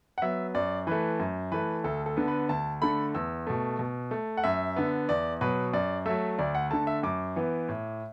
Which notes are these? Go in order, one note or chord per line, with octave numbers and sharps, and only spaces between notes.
F#5
F#3 B3 E5
F#2 D5
E3 A3 B4
F#2
E3 A3 B4
D2 A4
A4
D3 B3
B4
D2 A5
D3 A3 B5
E2 E6
B2 A3
B2
A3
F#5
F#2 E5
D3 B3
E2 D5
B2 F#3 B4
F#2 D5
F#3 A3 E5
D2 D5
F#5
D3 A3 A5
E5
F#2 D6
E3 B3
A2